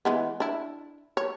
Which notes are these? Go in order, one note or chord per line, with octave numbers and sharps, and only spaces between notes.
E3 G#3 B3
D4 E4
C#5